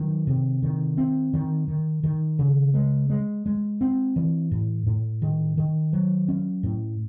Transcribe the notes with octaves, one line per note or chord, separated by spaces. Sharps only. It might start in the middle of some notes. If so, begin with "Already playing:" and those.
Already playing: D#3 F#3
C3
D#3
C4
D#3
D#3
D#3
C#3
G#3
G#3
G#3
C4
E3
A2
A2
D#3
D#3
F#3
C#4
A2